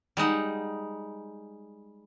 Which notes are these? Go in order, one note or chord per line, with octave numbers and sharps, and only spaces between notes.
G3 G#3 D#4 F#5